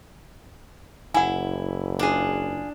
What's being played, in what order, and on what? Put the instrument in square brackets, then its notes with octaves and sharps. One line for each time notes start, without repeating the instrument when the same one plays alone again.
[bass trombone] F#1 [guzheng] E4 [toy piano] F#5 G#5
[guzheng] D4 [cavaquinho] F4 G#4